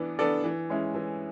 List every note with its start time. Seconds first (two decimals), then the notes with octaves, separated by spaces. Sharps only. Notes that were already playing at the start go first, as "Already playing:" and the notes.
Already playing: E3 B3 D4 D5
0.19 B3 D4 A4 D5
0.44 E3
0.70 G#3 C#4 E4
0.94 E3